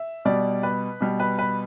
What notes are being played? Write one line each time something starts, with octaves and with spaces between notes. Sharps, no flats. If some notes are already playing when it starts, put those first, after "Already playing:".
Already playing: E5
B2 G3 D5
B4
B2 G3
B4
B4